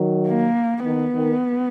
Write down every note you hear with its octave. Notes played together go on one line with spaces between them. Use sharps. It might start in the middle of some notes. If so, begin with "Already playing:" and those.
Already playing: D#3 F#3
A#3
D#3 B3
D#3